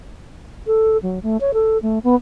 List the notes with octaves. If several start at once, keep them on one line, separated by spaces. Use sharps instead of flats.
A4
F#3
A3
C#5
A4
A3
B3